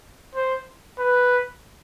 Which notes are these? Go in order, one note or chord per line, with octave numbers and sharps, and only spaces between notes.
C5
B4